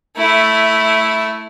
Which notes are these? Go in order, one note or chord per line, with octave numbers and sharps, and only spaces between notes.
A3 E4